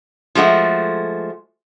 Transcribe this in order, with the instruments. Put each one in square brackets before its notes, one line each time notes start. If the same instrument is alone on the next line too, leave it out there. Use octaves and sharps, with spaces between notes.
[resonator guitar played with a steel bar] F3 G#3 A3 F#4